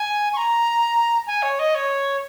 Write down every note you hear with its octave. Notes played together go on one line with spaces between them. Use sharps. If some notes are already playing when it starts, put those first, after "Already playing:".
Already playing: G#5
C#6
A#5
G#5
C#5
D#5
C#5